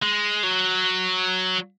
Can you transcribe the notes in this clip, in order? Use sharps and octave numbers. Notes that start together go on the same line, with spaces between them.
G#3
F#3